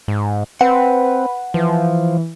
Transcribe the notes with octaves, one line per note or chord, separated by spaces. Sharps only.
G#2
C4 B4 F#5
E3 F3